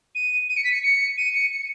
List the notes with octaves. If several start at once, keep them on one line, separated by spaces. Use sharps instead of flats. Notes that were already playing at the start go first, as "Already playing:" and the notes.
D#7
D#7
C#7
B6
C#7
C#7
D#7
C#7
C#7